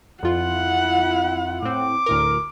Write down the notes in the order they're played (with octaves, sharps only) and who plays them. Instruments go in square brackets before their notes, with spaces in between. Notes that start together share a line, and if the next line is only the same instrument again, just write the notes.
[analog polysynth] F2 F4 [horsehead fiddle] E4 F#5
[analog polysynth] A2 C4 [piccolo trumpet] D6
[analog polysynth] D2 A2 A#4